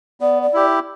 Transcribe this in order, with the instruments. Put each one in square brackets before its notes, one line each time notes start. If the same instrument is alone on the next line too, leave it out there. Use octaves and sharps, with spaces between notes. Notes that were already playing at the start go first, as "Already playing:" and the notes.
[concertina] B3 [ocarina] D5
[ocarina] D5
[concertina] E4 G4